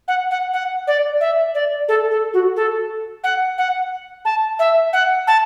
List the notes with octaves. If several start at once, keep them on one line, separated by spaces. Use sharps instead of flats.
F#5
F#5
F#5
D5
E5
D5
A4
A4
F#4
A4
F#5
F#5
A5
E5
F#5
A5